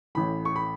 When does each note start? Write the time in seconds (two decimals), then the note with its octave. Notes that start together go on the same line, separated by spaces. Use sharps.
0.15 A1 A2 E3 B5
0.45 C#6
0.56 B5